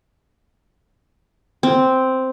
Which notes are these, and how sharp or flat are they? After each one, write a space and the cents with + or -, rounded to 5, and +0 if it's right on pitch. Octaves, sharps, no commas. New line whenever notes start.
C4 -5